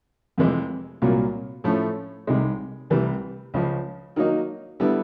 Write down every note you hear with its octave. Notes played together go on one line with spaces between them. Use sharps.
F2 C3 E3 G#3
C2 A#2 F#3 A#3
A2 F3 A3 C#4
C2 C3 D#3 G#3
C2 C3 E3 G3
C#2 C#3 F3
D#3 F#3 A#3 D#4
D3 G3 B3 E4